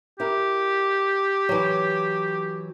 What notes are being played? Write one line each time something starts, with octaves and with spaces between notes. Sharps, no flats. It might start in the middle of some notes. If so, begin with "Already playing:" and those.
E4 G4 A#4
E3 F#3